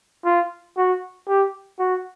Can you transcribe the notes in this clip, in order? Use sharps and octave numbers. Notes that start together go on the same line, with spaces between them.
F4
F#4
G4
F#4